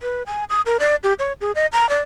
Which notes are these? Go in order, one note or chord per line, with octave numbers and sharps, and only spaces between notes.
B4
G#5
D#6
A#4
D5
G4
C#5
G#4
D#5
A#5
D5